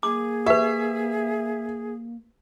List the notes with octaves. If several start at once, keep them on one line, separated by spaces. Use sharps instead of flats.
A#3 G#4 D6
G4 B4 E5